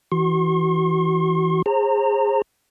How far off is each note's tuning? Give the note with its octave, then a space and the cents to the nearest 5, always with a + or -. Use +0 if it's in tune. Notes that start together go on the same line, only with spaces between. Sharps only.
E3 -5 F#4 +25 C6 +45
G#4 -15 C5 +30 A#5 -30